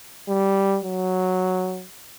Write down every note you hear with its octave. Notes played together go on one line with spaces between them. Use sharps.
G3
F#3